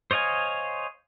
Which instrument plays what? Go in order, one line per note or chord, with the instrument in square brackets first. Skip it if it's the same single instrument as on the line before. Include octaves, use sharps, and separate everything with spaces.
[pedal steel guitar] C5 C#5 D#5 F5 G#5